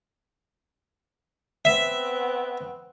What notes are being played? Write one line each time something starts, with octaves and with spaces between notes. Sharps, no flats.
B3 C4 E5